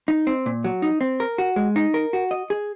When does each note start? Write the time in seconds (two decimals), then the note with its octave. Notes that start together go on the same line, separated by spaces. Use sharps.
0.08 D#4
0.27 C4
0.46 A#2
0.64 F#3
0.82 D#4
1.01 C4
1.20 A#4
1.38 F#4
1.56 G#3
1.76 D#4
1.94 A#4
2.13 F#4
2.31 D#5
2.50 G#4